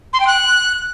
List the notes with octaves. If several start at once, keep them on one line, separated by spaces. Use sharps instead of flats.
C6
G5
F#6